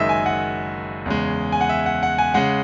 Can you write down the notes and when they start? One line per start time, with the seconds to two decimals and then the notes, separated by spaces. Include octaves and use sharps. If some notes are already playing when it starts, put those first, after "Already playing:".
Already playing: F#1 F#2 D#3 G#3 D#5 E5
0.09 G#5
0.26 F#5
1.06 E2 C#3 G#3
1.52 G#5
1.61 F#5
1.69 E5
1.86 F#5
2.03 F#5
2.18 G#5
2.34 C#3 G#3 F#5